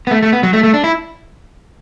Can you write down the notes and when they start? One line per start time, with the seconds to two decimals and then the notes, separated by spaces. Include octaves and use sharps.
0.07 B3
0.11 A3
0.22 A3
0.33 B3
0.43 F#3
0.53 A3
0.63 A3
0.74 D4
0.84 E4